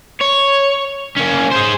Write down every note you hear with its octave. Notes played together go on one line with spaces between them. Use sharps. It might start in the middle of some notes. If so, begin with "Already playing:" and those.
C#5
A#3 C#4
G#4 C5